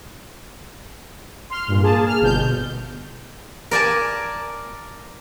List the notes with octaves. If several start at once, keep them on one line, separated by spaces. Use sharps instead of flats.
C6 F6
G2 A#2
A#3 G#4 A5
F6
G1 B2 G6
A#4 D5 G#5 A5